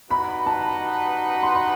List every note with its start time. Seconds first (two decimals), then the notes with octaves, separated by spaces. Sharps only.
0.10 G3 D#4 F#4 B4 F#5 B5
0.46 A5
1.43 C6
1.54 B5